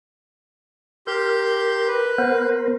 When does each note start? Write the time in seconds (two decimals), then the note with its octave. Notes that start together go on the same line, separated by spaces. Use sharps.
1.07 G4 A#4 C6 G6
1.88 B4
2.18 B3 A#4 C5